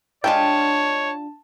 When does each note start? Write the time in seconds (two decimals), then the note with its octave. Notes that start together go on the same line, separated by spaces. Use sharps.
0.24 G#3 D4 F4 G4 C#5 G5 A5